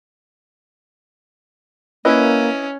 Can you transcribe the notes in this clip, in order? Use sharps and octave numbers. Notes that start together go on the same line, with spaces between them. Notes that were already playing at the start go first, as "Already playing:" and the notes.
A#3 C#4 E4 B4 D#5